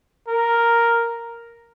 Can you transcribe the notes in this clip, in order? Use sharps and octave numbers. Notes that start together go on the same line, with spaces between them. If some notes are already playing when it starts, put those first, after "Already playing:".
A#4